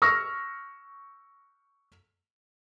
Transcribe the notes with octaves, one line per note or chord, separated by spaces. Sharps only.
C#6 E6 F6 A#6